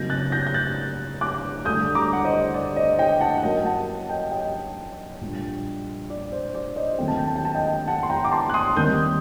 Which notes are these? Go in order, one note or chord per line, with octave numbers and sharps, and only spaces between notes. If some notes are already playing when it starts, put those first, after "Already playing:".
Already playing: F#1 F#2 F#3 C4 D#4 G6 A#6
F#6 A6
G6 A#6
G6
F#6 A6
D6 F#6
D2 D3 G3 D4 D#6 G6
A#5 D6
F#5
C5 D#5
D5
C5 D#5
D#5 G5
F#5 A5
F#5
F#2 F#3 A#3 D#4 D#5 G5
F#5 A5
D#5 G5
D#5 G5
A#1 A#2 G3 D4
D5
C5
D5
C5 D#5
D#2 D#3 F#3 A3 C4 G5
A5
G5
A5
G5
A5
D#5 G5
F#5 A5
C6
G5 A#5
D6
A5 C6
F#6
C6 D#6
D#2 D#3 G3 C4 D#6 G6